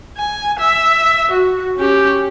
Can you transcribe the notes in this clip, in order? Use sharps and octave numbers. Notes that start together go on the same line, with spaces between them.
G#5
E5
F#4
C#4 G4